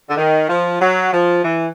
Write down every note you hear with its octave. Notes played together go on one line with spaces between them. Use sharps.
D3
D#3
F3
F#3
F3
E3